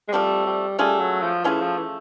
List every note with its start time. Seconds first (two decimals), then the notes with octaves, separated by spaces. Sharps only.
0.08 G#3
0.12 F3 G3 A3 C4
0.46 G3
0.78 G3 A3 C#4 F4 G#4
1.00 F#3
1.22 F3
1.44 E3 A3 C#4 F4 G#4
1.61 F3
1.78 E3